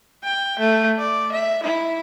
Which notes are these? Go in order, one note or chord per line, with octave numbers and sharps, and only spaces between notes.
G5
A3
D5
E5
E4